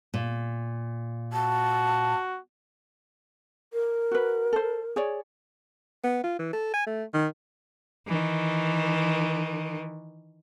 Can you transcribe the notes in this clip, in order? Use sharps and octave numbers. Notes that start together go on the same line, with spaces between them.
A#2
F#4 A5
A#4
F#4 B4
A4 C5
G#4 C#5 D5
B3
F4
E3
A4
G#5
A3
D#3
D#3 E3